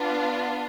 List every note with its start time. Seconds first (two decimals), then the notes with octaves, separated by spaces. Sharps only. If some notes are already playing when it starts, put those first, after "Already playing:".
Already playing: B3 D4 F4